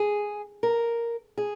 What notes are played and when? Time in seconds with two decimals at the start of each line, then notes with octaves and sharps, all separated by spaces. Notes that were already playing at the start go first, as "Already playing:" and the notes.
Already playing: G#4
0.63 A#4
1.37 G#4